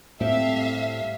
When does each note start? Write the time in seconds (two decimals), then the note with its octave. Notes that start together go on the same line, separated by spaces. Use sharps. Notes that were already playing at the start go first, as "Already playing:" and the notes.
0.20 A2 G3 C4 G4 A4 E5 F5